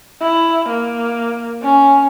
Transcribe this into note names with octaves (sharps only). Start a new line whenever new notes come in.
E4
A#3
C#4